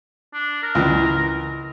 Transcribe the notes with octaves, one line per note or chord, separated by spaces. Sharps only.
D4
A#4
C#2 E3